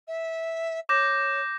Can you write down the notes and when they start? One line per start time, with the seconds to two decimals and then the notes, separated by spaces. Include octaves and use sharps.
0.07 E5
0.89 C#5 D6 G6 A#6